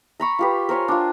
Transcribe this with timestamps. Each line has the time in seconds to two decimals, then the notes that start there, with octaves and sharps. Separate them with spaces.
0.20 A#5 B5 C#6
0.39 F4 G4 B4
0.69 A#4 C5 C#5 G#5
0.88 D4 F4